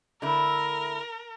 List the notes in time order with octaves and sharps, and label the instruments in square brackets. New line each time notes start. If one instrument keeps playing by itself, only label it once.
[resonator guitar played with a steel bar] D3 A3 E4 [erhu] A#4